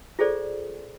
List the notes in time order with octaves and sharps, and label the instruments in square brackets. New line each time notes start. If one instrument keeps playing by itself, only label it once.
[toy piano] F4 G#4 A4 C5 D5